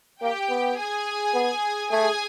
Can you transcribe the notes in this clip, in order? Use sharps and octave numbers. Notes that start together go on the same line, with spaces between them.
A#3 G4 G5
B3
G#4 G#5
B3
A3 G#4 G#5